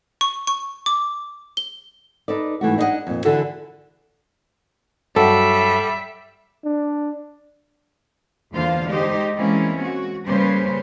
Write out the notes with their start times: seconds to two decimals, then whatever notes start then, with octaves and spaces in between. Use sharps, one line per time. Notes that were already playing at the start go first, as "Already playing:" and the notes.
0.21 C#6
0.47 C#6
0.86 D6
1.57 G7
2.28 D#4 A4 B4 D5
2.61 G#2 E3 A3 F#4
2.78 D4 D#4 G#4 A4 D#5 F#5
3.07 F2 A#2
3.25 D3 E3 D4 F#4 A4 B4
5.16 G2 F#3 G3 F#4 A4 E5
6.65 D4
8.53 E2 D3 A#3 F4 C5 F5
8.87 G#3 D#4 G4 C5
9.37 E3 G#3 A#3 C4 C#4 E4
9.83 F#4
10.26 C#3 G3 A#3 C#4 B4 C5